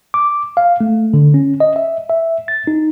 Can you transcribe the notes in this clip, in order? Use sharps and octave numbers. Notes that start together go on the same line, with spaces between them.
D6
F5
A3
D3
C#4
D#5
E5
E5
A6
D#4